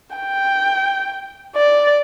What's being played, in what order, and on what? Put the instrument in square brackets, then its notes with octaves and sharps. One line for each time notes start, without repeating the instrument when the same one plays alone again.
[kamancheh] G5
D5